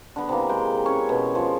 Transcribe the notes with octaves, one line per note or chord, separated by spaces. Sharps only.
D3 B3
C3 E3 A#3
G#3 G5
C#4 C#5
B2
F3 G#3